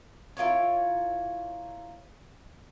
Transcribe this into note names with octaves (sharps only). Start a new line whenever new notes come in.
E4 F4 A#4 C#5